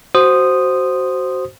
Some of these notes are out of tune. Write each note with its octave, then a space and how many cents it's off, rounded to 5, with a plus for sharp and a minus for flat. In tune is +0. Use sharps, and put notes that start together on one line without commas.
F#4 +15 C5 +0 D#6 -10